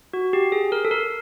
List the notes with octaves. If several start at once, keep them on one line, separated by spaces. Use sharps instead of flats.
F#4
G4
G#4
A#4
A4
A#4